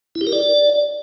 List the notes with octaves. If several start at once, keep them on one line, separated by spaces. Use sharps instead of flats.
E4
G4
A#4
D5